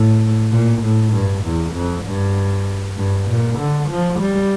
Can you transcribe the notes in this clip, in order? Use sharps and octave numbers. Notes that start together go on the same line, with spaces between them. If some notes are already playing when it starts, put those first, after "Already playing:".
Already playing: A2
A#2
A2
G2
E2
F2
G2
G2
A#2
D3
F3
G3